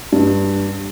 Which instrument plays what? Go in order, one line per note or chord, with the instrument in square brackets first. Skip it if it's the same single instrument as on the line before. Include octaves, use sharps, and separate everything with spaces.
[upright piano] G2